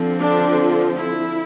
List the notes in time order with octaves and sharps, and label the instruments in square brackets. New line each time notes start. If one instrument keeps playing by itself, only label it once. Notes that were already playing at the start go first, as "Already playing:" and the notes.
Already playing: [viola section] D3 F3 C4
D4
E4